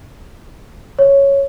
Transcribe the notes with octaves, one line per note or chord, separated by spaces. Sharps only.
C#5